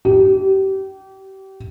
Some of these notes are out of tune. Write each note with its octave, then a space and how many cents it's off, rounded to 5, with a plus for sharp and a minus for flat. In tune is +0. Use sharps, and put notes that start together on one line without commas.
G4 -30